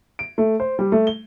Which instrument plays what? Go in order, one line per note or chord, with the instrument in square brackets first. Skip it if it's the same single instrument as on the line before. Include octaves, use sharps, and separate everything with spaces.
[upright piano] D7
A3
C5
G3
A3
G7